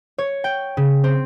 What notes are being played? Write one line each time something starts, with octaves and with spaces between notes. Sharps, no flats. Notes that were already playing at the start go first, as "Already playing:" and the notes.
C#5
G5
C#3
C4